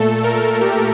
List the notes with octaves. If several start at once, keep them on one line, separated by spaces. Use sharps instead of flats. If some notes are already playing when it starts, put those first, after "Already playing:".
Already playing: A#2 A3 A4
A#4
G4